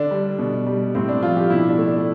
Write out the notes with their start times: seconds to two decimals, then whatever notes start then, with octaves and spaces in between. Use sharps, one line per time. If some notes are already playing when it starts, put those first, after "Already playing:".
Already playing: D3 D4
0.11 G3
0.39 B2
0.66 G3
0.95 A2 C4
1.09 D4
1.22 F3 F4
1.36 G4
1.50 B2 E4
1.68 D4
1.78 A3
1.88 D4